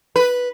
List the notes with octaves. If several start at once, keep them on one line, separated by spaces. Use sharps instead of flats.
B4